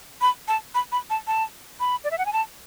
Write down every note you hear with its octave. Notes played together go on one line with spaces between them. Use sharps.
B5
A5
B5
B5
A5
A5
B5
D5
E5
F#5
G#5
A5